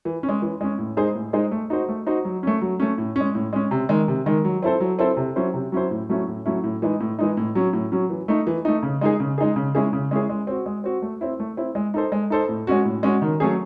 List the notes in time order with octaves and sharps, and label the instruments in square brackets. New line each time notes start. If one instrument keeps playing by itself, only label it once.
[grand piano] E3
C#4
G#3
E3
G#3 C#4
A2
G#3 D#4 G#4 C5
A2
G#3 D#4 G#4 C5
A3
D#4 F#4 C5
A3
D#4 F#4 C5
F#3
A3 C#4
F#3
A3 C#4
A2
G#3 C#4
A2
G#3 C#4
C3
D#3 G#3
C3
D#3 G#3
F#3
C4 E4 A4 C5
F#3
C4 E4 A4 C5
C3
F#3 C#4 E4 C5
C3
F#3 C#4 E4 C5
A2
F#3 A3 C#4 E4
A2
F#3 A3 C#4 E4
A2
E3 G#3 D#4
A2
E3 G#3 D#4
A2
F#3 C#4
A2
F#3 C#4
E3
A3 D#4
E3
A3 D#4
C#3
G#3 D#4 G#4
C#3
G#3 D#4 G#4
C#3
G#3 C#4 E4 G#4
C#3
G#3 C#4 E4 G#4
G#3
C4 F#4
G#3
C4 F#4
A3
C4 E4
A3
C4 E4
G#3
D#4 A4 C5
G#3
D#4 A4 C5
A2
G#3 C#4 F#4
A2
G#3 C#4 F#4
D#3
F#3 A3 C#4 G#4